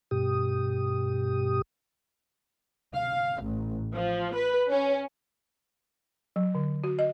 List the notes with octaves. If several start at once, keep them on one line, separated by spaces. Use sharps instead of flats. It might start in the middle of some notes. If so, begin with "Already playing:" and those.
G2 B2 G4 D#6
F5
A1
F3
B4
C#4
F#3
D3
F#4
D#5